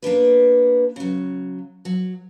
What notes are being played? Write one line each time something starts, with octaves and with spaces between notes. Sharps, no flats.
A#3 B3 D4 B4
C#3 F#3
F#3